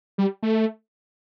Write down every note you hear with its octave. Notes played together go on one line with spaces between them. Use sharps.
G3
A3